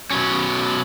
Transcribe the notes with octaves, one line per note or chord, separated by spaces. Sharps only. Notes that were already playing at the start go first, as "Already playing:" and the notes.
B2 F#3 C#4